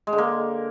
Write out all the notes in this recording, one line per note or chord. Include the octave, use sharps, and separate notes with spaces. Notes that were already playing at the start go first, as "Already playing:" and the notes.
G#3
D3
A#3